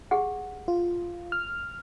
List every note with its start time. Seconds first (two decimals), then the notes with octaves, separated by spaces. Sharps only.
0.11 G4 G#4 F#5
0.68 F4
1.32 F6